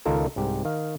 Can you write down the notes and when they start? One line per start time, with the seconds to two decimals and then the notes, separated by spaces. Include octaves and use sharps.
0.06 C#2 D#3 F4 A4 A#4
0.36 C2 G#2 G4
0.65 D#3 F5